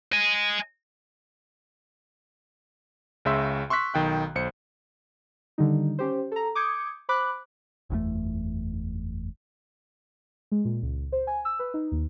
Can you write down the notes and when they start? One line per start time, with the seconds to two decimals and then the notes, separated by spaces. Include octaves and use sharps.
0.12 D#5 G#5
3.25 C#2 C#3 E5 C6 E6
3.70 C6 C#6 E6 F#6 B6
3.94 B1 D#3 G5 F#6
4.35 B1 C5 C#7
5.58 D3 D#3 G3 D#4
5.99 C#4 G4 C5
6.32 A4 A#5
6.55 D6 D#6 G6 G#6 C#7
7.09 C5 B5 D6 F#6
7.90 F#1 E2 C#3 A3
10.52 G#3
10.65 A#2
10.82 C#2
11.12 C5
11.27 G#5
11.45 E6
11.59 B4
11.74 D#4
11.92 D#2